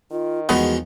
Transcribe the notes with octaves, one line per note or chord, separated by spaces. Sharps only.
D#3 F4
E2 F3 G#3 A3 B3 F#4